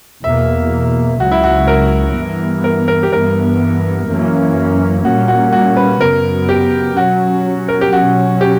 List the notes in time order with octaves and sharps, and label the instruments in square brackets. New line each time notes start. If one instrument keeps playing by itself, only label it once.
[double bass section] E2 B2 A#3 [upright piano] E5
[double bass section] C#2 C#3 F#3 [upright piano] F#4
[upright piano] E4
F#4
A#4
[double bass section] G2 E3 B3
[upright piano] A#4
A#4
G4
[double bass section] G2 E3 B3 [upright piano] A#4
[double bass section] F#2 E3 A#3 C#4
[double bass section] A#2 G3 A#3 C#4 [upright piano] F#4
[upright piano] F#4
F#4
B4
[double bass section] F#2 C#3 F#3 B3 [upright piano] A#4
[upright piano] G4
[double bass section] B2 F#3 C#4 [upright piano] F#4
[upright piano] A#4
G4
[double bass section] B2 F#3 C#4 [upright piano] F#4
[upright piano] G4